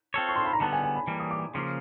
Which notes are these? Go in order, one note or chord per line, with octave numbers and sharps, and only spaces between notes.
C4 F4 A4 C#5
C#6
C6
B5
A#5
D3 G3 B3 A5
G#5
G#5
B5
E3 G3 A#3
D#6
D6
C#3 F3 A#3 C6